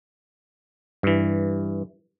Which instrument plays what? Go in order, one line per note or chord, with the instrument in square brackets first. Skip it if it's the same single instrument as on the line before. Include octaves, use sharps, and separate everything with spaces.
[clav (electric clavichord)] G2 E3